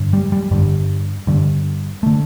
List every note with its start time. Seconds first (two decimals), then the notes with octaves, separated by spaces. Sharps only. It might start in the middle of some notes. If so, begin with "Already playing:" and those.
Already playing: G2 D3
0.13 G3
0.32 G3
0.51 G2 D3 G3
1.27 G2 D3
2.03 D3 A3